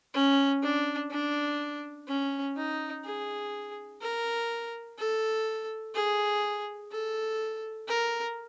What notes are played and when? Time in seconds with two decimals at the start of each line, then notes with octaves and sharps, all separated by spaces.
0.14 C#4
0.62 D4
1.11 D4
2.08 C#4
2.56 D#4
3.05 G#4
4.01 A#4
4.98 A4
5.95 G#4
6.92 A4
7.88 A#4